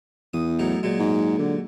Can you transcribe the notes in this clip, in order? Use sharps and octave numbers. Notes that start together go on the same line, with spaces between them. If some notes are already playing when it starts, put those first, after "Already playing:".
E2 D#6
A2 F#3 D#4
A#2 F#3 G#3
G#2
D3